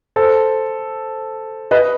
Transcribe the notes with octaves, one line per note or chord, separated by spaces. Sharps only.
A4 C5
B4 D#5